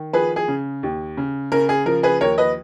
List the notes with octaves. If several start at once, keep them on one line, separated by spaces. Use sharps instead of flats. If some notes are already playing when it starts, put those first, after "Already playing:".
Already playing: D#3
F3 G#4 B4
G#4
C#3
D#2
C#3
C#3 A#4
G#4
F3 A#4
G#4 B4
D#2 A#4 C#5
B4 D#5